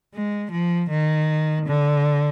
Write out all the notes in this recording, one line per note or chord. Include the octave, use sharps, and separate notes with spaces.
G#3
F3
D#3
D3